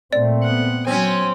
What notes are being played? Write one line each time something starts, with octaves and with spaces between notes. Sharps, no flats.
A#2 A3 C4 D5
B3 F#5
F#3 C4 C#4 G#5